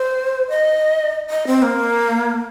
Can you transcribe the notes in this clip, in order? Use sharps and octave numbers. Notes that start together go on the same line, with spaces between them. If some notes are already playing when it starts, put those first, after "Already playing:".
Already playing: C5
D#5
D#5
C4
A#3